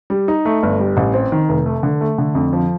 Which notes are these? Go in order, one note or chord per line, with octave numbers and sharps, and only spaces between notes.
G3
D#4
A3
G1
G3
A1
C4
D#3
F1
A3
D3
A3
D3
F2
F3